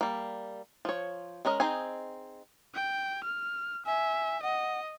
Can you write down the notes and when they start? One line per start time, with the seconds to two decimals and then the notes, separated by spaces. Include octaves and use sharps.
0.01 G3 A#3
0.85 F3 C#5
1.45 G#3 C#4 A#4 D#5
1.60 C4 D#4 G#4 D#5 G#5
2.75 G5
3.24 F6
3.86 E5 G#5
4.43 D#5 F#5